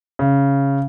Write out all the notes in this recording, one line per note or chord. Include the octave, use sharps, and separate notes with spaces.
C#3